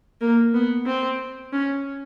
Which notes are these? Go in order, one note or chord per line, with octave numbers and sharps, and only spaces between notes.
A#3
B3
C4
C#4